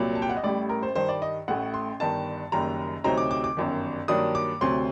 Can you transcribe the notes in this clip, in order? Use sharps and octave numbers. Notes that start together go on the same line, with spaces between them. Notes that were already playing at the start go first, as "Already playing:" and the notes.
Already playing: C2 A#2 F#3 D5
A5
G5
F#5
D#5
A1 A2 G3 D5
A#4
C5
G2 D#3 G3 C5
D5
D#5
A1 A2 A3 F#5
C6
G1 G2 D#3 A5
F#1 F#2 D#3 G3 A#5
D2 C3 F#3 C4 D#4 A#5
D6
D6
D6
G1 F#2 D#3
G2 D#3 F#3 A#3 D4 D#6
D6
D2 C3 F#3 C4 C6